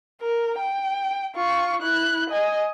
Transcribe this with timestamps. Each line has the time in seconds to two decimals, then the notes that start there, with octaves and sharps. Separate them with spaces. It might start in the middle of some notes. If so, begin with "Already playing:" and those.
0.22 A#4
0.58 G5
1.35 F4 C#6
1.82 E4 F#6
2.30 D#5 G#5